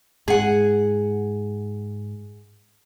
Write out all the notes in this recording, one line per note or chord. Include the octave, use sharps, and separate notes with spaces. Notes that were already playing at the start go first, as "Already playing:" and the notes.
G#2 G#4 F#5